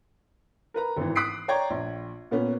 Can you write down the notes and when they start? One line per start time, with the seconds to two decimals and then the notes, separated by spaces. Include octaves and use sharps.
0.74 A#4 B4 A#5
0.97 G#1 E3
1.15 D#6 F#6 B6 C7 D7
1.48 C#5 D5 G5 A#5 C#6 G#6
1.70 A#1
2.31 A#2 B3 C#4